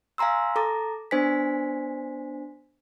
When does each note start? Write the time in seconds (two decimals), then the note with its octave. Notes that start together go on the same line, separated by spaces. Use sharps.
0.18 F5 G#5 A#5 C6 E6
0.56 A4 A#5 D6 A6
1.11 B3 D4 C5 G#5 B6